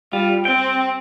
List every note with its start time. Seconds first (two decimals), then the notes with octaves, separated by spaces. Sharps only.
0.13 G3 F4
0.45 C4 G5